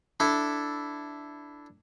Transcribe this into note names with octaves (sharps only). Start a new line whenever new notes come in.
D4 E4 A4